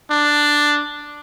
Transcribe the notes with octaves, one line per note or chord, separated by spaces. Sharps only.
D4